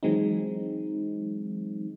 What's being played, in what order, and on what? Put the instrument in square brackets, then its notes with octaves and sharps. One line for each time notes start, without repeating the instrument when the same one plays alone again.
[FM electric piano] E3 F#3 G#3 C4 D#4